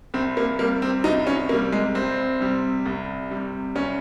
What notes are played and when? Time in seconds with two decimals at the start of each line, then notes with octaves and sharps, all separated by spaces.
0.14 C2 C4
0.37 A#3
0.59 C3 G3 A#3
0.82 C4
1.04 C2 D#4
1.27 C#4
1.49 C3 G3 A#3
1.72 G#3
1.95 C2 C4
2.40 C3 G3
2.86 C2
3.31 C3 G3
3.75 C2 C#4